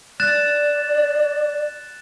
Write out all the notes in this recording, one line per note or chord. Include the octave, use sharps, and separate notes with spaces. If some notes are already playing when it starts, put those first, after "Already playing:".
D5 F#6 A6 E7